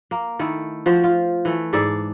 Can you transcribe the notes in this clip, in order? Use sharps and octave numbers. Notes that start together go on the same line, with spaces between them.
A#3
D#3 A3 E4
F3 F#4 C5
F4
E3 A3
G#2 G#4 A4 D5